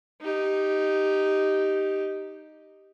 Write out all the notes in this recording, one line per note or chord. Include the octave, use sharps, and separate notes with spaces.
D#4 G4